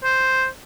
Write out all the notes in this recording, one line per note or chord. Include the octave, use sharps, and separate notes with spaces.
C5